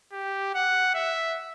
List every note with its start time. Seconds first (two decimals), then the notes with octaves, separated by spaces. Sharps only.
0.13 G4
0.55 F#5
0.94 E5